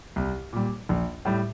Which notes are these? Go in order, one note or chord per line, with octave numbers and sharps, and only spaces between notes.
C2
A#2 G3
A#1
A2 G3